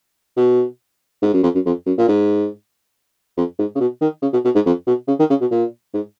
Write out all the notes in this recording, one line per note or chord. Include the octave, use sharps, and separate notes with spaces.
B2
G#2
F#2
F2
F#2
F2
F#2
A#2
G#2
F2
G#2
C#3
B2
D#3
C#3
B2
B2
G#2
F2
B2
C#3
D#3
C#3
B2
A#2
G#2